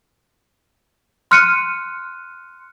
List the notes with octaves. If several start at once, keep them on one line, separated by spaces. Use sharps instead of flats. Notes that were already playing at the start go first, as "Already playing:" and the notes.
C6 F6 F#6 C#7 D#7